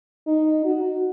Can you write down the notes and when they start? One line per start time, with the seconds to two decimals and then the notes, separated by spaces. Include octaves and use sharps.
0.27 D#4
0.65 F#4